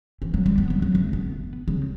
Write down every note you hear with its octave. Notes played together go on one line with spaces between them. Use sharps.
E3
F#3
G3
B3
F#3
F#3
A3
B3
C#3